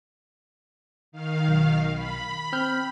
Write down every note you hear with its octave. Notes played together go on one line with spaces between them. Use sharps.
D#3 F5
B1
B5
C4 F6 G6